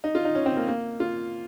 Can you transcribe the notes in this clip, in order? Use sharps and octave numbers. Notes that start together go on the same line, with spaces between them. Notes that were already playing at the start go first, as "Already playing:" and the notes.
D#4
F4
D#4
C#4
C4
A#3
A#3
F4